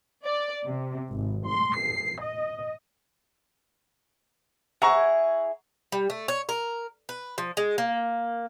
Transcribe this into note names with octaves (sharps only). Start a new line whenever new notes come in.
D5
C3
G#1
C6
C7
D#5
E4 G#4 F#5 A#5 C#6
G3
A3
C#5
A#4
B4
F3
G#3
A#3